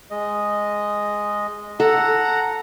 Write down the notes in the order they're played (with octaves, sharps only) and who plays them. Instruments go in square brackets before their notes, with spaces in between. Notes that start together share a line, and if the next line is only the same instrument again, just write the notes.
[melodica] G#3 D#5
[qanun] A4 [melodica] F#5 A#5